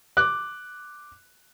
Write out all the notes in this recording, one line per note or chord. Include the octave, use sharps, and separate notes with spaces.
D6 F#6